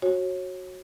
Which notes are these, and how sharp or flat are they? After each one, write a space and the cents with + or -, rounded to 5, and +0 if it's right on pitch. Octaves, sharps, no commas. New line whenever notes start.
F#4 +0 C#5 -30